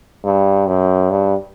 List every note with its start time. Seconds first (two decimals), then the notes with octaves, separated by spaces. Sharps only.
0.24 G2
0.67 F#2
1.11 G2